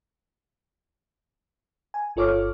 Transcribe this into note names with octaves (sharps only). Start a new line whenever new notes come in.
G#5
G1 F4 A4 C#5 D6 F6